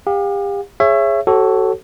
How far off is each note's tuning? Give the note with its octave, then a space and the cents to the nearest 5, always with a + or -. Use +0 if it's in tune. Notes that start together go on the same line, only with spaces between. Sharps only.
G4 +35 F5 +40
G#4 +0 C#5 -10 E5 +25
F#4 +35 A4 +0 C#5 -30